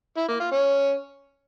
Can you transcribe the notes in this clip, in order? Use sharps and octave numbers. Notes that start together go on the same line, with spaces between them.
E4
A#3
F4
C#4